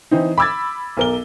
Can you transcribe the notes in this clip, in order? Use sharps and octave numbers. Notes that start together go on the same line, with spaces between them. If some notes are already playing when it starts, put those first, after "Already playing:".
E3 C4 D#4
B5 D6 E6 G#6 A6
B1 A#4 G7